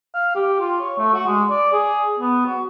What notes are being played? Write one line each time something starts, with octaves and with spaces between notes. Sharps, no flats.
F5
G4
F4
C#5
A3
F#4
G#3
D5
G#4
B3
F#4